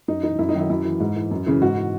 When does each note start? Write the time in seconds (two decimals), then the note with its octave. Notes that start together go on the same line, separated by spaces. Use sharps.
0.08 F#2 D#4
0.23 E3 D#4
0.39 F#2 E4
0.49 D#4
0.55 D#3 F#3 E4
0.70 F#2 E4
0.85 E3
1.00 G#2
1.16 E3
1.31 F#2
1.46 C#3 E3
1.62 G#2 F#4
1.77 E3